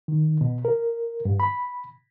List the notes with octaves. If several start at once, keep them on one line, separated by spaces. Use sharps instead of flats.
D#3
B2
A#4
G2
B5